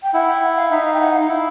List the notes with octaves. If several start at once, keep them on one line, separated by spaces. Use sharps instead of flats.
G5
E4 F#5
G5
F#5
F5
D#4 E5
F5
G5
F#5
F5
D#4
E4